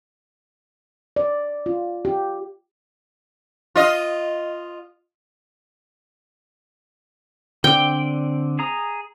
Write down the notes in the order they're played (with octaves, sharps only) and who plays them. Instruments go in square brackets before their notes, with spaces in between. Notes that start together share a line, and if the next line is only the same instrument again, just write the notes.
[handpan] D5
F4
G4
[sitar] F4 D#5
[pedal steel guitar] D3 C4 D5 [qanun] G5
[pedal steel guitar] G#4 A#5 D#6